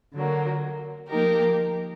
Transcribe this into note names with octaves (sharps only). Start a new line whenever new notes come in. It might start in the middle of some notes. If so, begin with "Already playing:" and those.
D3 F#3 A#3
F3 A#3 D#4 G4 A#4